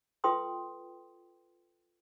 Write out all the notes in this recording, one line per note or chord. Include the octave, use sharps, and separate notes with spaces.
F4 A4 B4 G5 C6 D#6